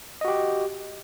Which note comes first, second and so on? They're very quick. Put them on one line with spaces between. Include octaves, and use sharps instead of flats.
D#5 F#4 G4